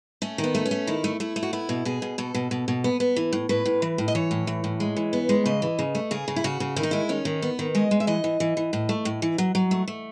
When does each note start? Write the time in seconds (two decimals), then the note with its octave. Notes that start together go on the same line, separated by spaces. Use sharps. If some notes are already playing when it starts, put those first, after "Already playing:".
0.22 A3 C#4
0.38 D#3
0.44 B3
0.55 A3
0.66 C#4
0.71 A3
0.87 D#3 E4
1.04 A3
1.20 A3 E4
1.36 A3
1.43 F#4
1.53 B3 E4
1.69 B2
1.85 B2 G#4
2.02 B2
2.18 B2 A4
2.34 B2
2.51 B2
2.68 B2
2.84 B3
3.00 B3
3.16 E3
3.33 A2
3.49 A2 B4
3.66 A2
3.82 E3
3.98 A2
4.08 D#5
4.15 E3 C#5
4.31 A2
4.47 E3
4.64 A2
4.80 G#3
4.97 E3
5.13 B3
5.29 G#3
5.46 C#3 D#5
5.62 E3
5.79 C#3
5.95 A3
6.11 C#3 G#4
6.28 C#3
6.36 E4
6.44 C#3 F#4
6.60 C#3
6.76 D#3 E4
6.83 D#4
6.91 G#3 E4
7.09 D#3 C#4
7.25 D#3
7.42 B3
7.59 D#3
7.75 G#3 D#5
7.91 G#3
8.00 E5
8.07 E3 D#5
8.24 E3
8.40 E3
8.57 E3
8.73 A2
8.89 A3
9.05 A2
9.22 E3
9.38 F#3
9.55 F#3
9.71 A3
9.88 A3